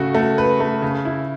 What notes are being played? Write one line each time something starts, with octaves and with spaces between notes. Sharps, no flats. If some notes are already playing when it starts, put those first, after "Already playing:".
Already playing: C#3 A3 F#4
A3
B4
A3
C#3
E4